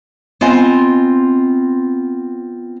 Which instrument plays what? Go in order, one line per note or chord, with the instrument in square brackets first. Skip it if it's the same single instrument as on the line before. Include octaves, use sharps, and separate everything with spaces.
[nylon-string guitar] B3 C4 F4 D#5 G#5